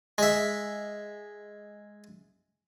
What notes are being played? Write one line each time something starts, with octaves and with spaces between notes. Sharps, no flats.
G#3 E5